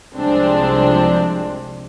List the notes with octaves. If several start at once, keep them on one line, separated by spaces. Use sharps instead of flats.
C2 C3 F3 G#3 C4 D4